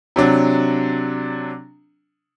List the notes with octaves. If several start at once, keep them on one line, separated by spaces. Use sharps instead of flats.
C3 F#3 D4